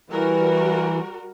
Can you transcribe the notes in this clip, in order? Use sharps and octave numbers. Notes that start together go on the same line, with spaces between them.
E3 G3 F#4 A#4